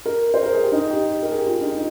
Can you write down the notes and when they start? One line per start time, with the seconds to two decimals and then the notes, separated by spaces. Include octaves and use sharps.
0.06 A#4
0.34 C5
0.43 A#4
0.53 G#4
0.63 G4
0.72 D#4
0.90 G4
1.22 A#4
1.31 G#4
1.38 G4
1.47 F4
1.61 D#4
1.75 D#4